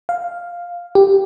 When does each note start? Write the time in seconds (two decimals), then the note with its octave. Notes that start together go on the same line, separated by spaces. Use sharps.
0.09 F5
0.95 G4